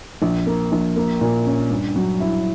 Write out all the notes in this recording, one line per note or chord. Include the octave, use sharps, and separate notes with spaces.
A#1
A#3
A#1
A#3
A#2
C#4
G2
F#3
E4